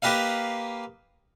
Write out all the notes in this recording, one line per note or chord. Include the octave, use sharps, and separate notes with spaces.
A#3 G4 B4 D#5 F5